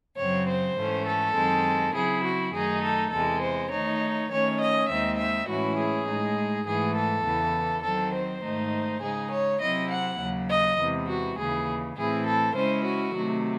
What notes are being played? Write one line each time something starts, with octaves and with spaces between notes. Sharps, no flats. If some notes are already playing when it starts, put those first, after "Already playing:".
F#2 C#3 F#3 C4 C#5
C5
G#2 E3 A3 C#4
A4
F#2 D#3 G#3 C4
C#3 F#3 C4 E4 G#4
F#4
F#2 D#3 A3 D#4 G#4
A4
E2 C3 E3 G#3 A4
C5
D#3 A3 D#4 C#5
D#3 A3 C#4 C#5
D#5
D#2 D#3 G#3 C4 D#4 E5
E5
A2 E3 G#3 C#4 E4 F#4
G#4
A2 G#3 D#4
G#2 E3 A3 G#4
A4
E2 C#3 E3
D#3 F#3 C4 A4
C5
G#2 D#3 A3 D#4
C#3 G#3 D#4 G#4
C#5
C3 F#3 C4 E4 D#5
F#5
D#2 C#3 F#3
D#5
E2 C3 E3 G#3
F#4
D#2 C#3 E3 G#4
A2 E3 C4 E4 G#4
A4
C#3 G#3 C#4 E4 C5
F#4
C3 D#3 F#3 A3